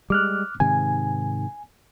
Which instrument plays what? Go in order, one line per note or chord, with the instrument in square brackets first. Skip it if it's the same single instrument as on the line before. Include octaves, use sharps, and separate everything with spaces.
[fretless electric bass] G3 G#3 [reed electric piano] D6 F6 F#6
[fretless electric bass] G#2 C3 D#3 [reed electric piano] G#5